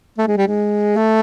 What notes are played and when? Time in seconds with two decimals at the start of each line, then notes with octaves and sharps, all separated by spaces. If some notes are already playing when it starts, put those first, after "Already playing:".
0.18 A3
0.27 G#3
0.37 G3
0.47 G#3
0.96 A3